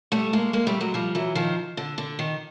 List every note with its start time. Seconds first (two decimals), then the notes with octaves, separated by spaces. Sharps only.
0.12 G3 A3
0.33 G#3 A#3
0.53 G#3 A#3
0.67 G3 A3
0.80 F#3 G#3
0.94 F3 G3
1.15 E3 F#3
1.35 D#3 F3
1.77 D3
1.98 D3
2.19 D#3